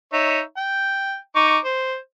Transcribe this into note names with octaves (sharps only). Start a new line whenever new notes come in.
D#4 C#5 E5
G5
D#4 C#6 D6
C5